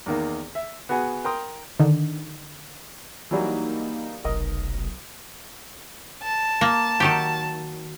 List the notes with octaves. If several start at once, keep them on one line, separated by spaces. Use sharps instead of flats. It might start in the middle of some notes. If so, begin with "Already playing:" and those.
E2 D#3 A#3
E5
B3 F#4 G#4 F#5 G#5
A#4 G5 A#5 C6 D#6
D3 D#3
E3 F#3 G3 A#3 D#4
F1 B1 A#4 D#5
A5
A#3
D#3 F#3 G4